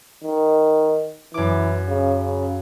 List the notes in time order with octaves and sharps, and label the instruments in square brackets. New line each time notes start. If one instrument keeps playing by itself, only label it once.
[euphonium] D#3
[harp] F#2 D6 [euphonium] E3
[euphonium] C#3
C#3